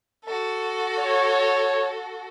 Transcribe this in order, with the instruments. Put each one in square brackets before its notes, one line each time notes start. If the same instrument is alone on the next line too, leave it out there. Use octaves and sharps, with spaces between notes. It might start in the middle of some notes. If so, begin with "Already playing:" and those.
[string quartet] F#4 A4
[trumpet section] C#5